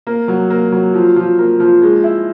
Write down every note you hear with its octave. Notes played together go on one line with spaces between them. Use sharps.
A#3
F#3
A#3
F#3
F3
F3
A#3
F3
G#3
E4